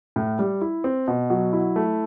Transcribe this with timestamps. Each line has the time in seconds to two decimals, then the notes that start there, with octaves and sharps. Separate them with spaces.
0.16 A2
0.39 G3
0.61 E4
0.84 C4
1.08 B2
1.30 F#3
1.53 E4
1.76 A3